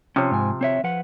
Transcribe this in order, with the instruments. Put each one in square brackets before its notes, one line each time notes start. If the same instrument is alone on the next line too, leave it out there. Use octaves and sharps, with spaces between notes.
[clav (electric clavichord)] C3 F3 [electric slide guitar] C#4 C#5
[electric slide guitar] G#2 G#5
C4 C#5 E5
F3 B4 F#5